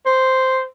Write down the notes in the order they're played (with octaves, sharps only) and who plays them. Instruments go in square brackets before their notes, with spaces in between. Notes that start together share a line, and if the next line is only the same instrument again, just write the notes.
[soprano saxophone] C5